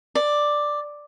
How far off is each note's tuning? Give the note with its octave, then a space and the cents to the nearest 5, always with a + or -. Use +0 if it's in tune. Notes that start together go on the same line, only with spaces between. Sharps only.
D5 +5